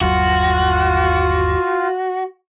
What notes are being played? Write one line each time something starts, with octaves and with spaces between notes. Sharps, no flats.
G1 D#2 F#3 F4 F#4